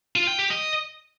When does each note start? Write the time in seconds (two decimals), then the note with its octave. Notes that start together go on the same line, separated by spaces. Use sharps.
0.16 F4
0.27 G5
0.39 G4
0.50 D#5